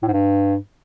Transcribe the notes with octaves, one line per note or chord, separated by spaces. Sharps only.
A2
G#2
G2